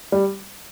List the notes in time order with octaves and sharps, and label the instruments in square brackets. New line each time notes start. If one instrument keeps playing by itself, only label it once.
[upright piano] G3